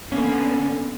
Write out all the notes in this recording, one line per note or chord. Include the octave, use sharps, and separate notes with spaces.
D3 A#3 B3 C#4